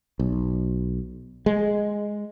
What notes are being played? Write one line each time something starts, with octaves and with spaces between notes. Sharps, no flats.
B1
G#3